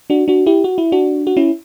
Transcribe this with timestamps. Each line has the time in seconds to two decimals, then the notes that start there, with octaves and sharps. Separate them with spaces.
0.10 D4 F#4
0.28 D4 F#4
0.46 E4 G4
0.64 F#4
0.78 E4
0.92 D4 F#4
1.27 F#4
1.37 C#4 E4